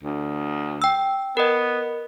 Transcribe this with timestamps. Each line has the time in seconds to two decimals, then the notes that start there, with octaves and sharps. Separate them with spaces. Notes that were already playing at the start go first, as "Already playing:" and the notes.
0.03 D2
0.82 G5 E6
1.37 B3 A#4 D#5